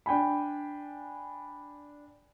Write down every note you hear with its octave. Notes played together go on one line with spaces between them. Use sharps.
D4 G5 G#5 B5